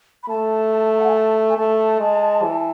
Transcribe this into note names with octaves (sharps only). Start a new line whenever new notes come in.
B5
A3 A5
F#5
G#5
A5
G#5
A3 A5
G#3
E3